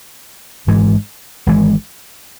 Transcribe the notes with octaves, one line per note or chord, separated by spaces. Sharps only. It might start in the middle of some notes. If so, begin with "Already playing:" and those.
G#1 G#2 E3 G#3
G#1 G#2 E3 G#3